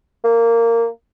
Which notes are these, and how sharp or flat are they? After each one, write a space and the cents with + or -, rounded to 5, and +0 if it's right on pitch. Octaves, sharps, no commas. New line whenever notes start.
A#3 -15